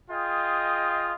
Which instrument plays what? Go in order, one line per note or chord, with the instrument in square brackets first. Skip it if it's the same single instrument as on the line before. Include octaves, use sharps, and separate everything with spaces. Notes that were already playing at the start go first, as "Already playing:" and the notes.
[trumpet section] F4 G#4 D#5 G5